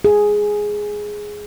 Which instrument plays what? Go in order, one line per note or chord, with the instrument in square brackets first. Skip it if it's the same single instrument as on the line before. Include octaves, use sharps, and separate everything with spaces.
[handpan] G#4